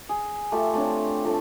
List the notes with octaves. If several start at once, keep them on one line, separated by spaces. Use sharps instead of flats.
G#4
A3 F4 G4 E5
A3 C4 D4 C#5
F3 A3 F4